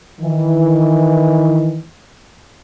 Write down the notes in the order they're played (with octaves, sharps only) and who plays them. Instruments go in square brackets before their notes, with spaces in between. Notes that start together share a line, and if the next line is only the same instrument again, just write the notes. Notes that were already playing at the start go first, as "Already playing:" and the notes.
[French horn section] D#3 E3